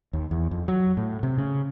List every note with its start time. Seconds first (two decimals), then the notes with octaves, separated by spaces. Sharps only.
0.13 D#2
0.31 E2
0.51 F2
0.68 F#3
0.97 A2
1.23 C3
1.38 C#3